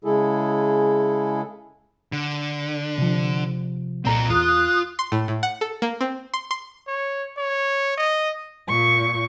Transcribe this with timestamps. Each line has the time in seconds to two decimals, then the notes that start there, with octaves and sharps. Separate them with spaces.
0.05 C#3 G#3 E4 G#4 A4
2.12 D3
2.98 C3 F3
4.05 C2 A#2 C4 A4 A#5
4.30 E2 F4 D#6 F#6
4.99 C6
5.12 A2
5.28 A2
5.43 F#5
5.61 A4
5.82 A#3
6.01 C4
6.34 C6
6.51 C6
6.88 C#5
7.38 C#5
7.98 D#5
8.66 A#2 C#6